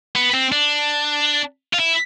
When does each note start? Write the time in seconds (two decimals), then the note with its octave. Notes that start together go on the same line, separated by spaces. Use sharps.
0.15 B3
0.34 C4
0.52 D4
1.74 F4
1.80 E4